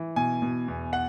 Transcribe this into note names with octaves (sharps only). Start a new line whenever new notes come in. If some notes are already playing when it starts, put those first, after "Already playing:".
Already playing: E3
B2 G#5
B2
E2
F#5